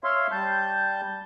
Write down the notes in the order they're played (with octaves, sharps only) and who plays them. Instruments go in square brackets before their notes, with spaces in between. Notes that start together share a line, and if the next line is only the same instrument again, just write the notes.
[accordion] C#5 E5 F5 C6
G3 A5 G6